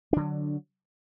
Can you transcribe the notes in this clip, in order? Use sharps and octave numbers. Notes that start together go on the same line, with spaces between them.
D3 F#3 D4